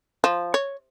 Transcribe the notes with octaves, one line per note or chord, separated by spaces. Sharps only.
F3
C#5